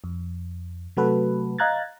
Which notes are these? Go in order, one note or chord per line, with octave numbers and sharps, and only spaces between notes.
F2
C3 F#3 A3 F#4 A4 B4
D#5 F5 A#5 F#6 G#6 A6